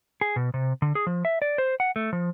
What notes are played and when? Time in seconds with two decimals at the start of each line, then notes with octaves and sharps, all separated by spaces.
0.21 G#4
0.36 B2
0.54 C3
0.82 D3
0.95 G#4
1.07 F3
1.25 E5
1.42 D5
1.58 C5
1.80 F#5
1.96 A3
2.13 F3